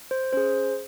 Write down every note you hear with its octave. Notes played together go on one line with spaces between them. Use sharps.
C5
C#4 G#4 C5